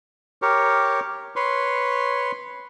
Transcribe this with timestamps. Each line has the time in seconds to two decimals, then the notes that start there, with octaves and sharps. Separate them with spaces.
0.42 G4 A#4 C#5
1.36 B4 C#5 C6